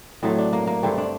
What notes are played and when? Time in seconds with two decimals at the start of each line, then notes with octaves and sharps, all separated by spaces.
0.23 A2 F#3 A3 C4
0.38 D4
0.53 A#3
0.67 A#3
0.83 G2 D3 A3 C4
0.98 D4